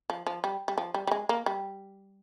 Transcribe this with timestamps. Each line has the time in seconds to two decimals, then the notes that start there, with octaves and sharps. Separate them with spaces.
0.10 F3
0.27 F3
0.44 G3
0.68 G3
0.78 F3
0.94 G3
1.07 G3
1.11 G#3
1.29 A#3
1.46 G3